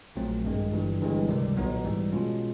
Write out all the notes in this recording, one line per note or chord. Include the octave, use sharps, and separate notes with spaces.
A#1 A#2 F#3 A3 C4
G#1 G2 D#3 G#3
G1 G2 E3 G3
G1 G2 E3 G#3
C#2 C3 D#3 G3
B1 A#2 F#3 B3 D#4
G#2 E3 G3
B2 G#3 C#4 F4